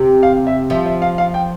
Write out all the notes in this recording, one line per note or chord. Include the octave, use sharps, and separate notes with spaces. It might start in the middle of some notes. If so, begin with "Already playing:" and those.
Already playing: C3
F5
E5
F3 E5
E5
F5
F5
G5